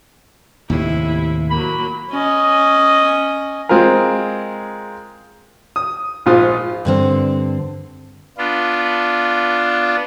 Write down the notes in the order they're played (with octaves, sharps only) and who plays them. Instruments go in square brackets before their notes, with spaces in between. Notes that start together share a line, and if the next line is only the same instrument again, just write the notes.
[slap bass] D#2 A2 C3 [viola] E4
[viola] F#3 A#3 [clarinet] B5
[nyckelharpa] C#4 D#5
[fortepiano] G#3 C4 F4 G#4 A#4
D#6
A#1 G#2 F4 D#6
[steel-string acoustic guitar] G2 D3 C4
[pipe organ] B3 D4 F4